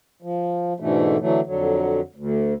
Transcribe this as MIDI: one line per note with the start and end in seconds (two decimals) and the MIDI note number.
0.22 0.73 53
0.80 1.17 44
0.80 1.17 47
0.80 1.17 50
0.80 1.17 52
0.80 1.17 57
1.20 1.41 50
1.20 1.41 52
1.20 1.41 54
1.20 1.41 57
1.47 2.00 41
1.47 2.00 50
1.47 2.00 54
2.16 2.54 38